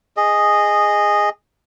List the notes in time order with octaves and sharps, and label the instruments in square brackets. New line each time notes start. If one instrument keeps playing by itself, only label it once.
[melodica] G#4 D#5